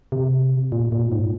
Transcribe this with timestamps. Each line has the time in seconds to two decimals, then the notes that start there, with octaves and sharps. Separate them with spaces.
0.12 C3
0.72 A#2
0.92 A#2
1.12 G#2